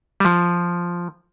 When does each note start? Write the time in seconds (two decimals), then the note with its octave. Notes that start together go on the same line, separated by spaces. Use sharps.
0.20 G3
0.25 F3